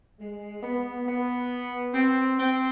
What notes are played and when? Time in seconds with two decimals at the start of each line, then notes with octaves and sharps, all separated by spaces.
0.19 G#3
0.63 B3
1.07 B3
1.94 C4
2.38 C4